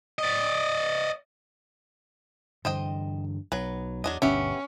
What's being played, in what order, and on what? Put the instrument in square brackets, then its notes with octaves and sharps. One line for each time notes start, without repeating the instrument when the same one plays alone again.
[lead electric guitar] D5 D#5
[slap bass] G2 D3 E3 [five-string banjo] C5 D#5 G5
[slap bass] B1 [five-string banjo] F#3 B4
[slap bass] E2 [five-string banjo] F#3 D4 D#5
[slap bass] G1 D2 B2 [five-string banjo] B3 G4 E5 [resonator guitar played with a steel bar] C#4